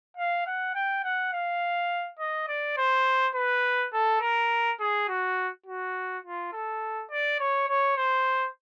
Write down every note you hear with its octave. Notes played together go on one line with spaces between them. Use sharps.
F5
F#5
G5
F#5
F5
D#5
D5
C5
B4
A4
A#4
G#4
F#4
F#4
F4
A4
D5
C#5
C#5
C5